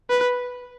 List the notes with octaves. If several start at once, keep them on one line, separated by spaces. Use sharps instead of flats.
B4